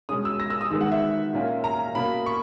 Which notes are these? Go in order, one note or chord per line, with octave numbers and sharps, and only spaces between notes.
B2 G#3 C#4 D#6
E6
A#6
E6
D#6
D#3 G#3 B3 E6
F#5
E5
A#2 A#3 C#4
A#5
B2 A#3 C#4 B5
C#6